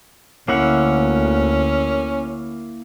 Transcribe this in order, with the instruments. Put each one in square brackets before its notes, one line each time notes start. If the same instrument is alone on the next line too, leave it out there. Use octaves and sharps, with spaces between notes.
[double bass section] D2 [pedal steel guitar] A#3 E4 F#5 [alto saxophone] C#4